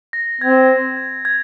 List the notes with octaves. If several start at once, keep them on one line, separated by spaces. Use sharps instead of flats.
A#6
C4 G#6
G#6
G#6
G#6